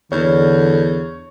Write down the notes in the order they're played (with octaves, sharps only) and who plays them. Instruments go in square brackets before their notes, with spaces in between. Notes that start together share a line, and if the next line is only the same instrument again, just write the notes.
[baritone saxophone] E2 [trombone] D3 [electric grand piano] C#5